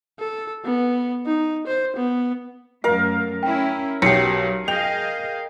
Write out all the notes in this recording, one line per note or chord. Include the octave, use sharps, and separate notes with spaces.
A4
B3
D#4
C5
B3
F#2 A3 A#4 F5
C#4 E4 G5
B1 F#3 G4 C7 C#7
G#4 D#5 F5 G5 F7